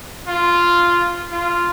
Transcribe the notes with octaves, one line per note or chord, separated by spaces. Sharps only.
F4
F4